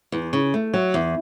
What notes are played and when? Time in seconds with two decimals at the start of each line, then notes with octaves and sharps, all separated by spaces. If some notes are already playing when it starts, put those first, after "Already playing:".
0.12 E2
0.33 C#3
0.54 A3
0.74 F#3
0.94 E2